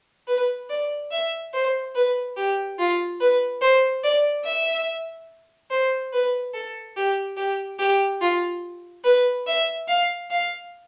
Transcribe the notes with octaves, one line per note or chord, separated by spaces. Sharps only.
B4
D5
E5
C5
B4
G4
F4
B4
C5
D5
E5
C5
B4
A4
G4
G4
G4
F4
B4
E5
F5
F5